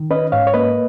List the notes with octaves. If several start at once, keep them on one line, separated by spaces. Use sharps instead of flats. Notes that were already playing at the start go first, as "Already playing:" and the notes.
Already playing: D#3
C#4 B4 D#5
G#2 C#5 F5
C#5
A#3 B4 D#5